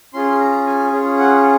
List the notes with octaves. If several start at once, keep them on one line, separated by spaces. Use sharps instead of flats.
C#4 F4 G#4 C6
A#5
G#5
C#4 F4 G#4
F#5